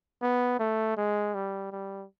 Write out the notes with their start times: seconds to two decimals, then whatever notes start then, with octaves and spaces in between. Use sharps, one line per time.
0.22 B3
0.60 A3
0.97 G#3
1.35 G3
1.72 G3